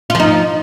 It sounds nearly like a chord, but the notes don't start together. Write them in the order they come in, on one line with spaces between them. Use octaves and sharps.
F4 F3 D#4